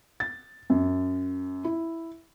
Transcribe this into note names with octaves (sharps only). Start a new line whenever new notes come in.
A6
F#2
E4